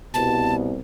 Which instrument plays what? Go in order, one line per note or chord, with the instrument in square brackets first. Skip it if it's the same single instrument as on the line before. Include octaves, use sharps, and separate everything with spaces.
[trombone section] C2 B2 [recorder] A5